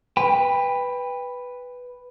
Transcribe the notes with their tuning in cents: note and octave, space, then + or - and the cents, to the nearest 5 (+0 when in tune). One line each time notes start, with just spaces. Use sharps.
B4 +0 G5 +25